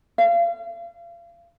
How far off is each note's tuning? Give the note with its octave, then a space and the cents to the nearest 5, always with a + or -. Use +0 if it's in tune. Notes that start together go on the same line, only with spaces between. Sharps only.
F5 -35